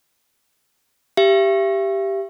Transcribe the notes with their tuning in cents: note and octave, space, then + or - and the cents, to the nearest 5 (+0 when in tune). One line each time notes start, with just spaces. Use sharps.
G4 +0 E5 +40